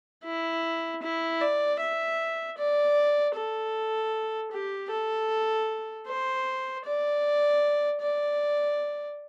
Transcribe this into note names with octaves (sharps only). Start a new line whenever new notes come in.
E4
E4
D5
E5
D5
A4
G4
A4
C5
D5
D5